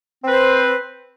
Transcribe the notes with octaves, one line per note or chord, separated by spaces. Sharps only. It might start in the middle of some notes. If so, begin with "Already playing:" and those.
C4 B4 C5